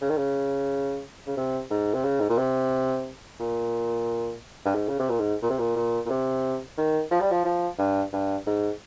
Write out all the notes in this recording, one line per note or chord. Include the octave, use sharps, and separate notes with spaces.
C#3
D#3
C#3
C#3
C3
G#2
C3
C#3
G#2
A#2
C3
A#2
G2
G#2
C#3
C3
A#2
G#2
A#2
C3
A#2
A#2
A#2
C3
D#3
F3
G3
F3
F3
G2
G2
G#2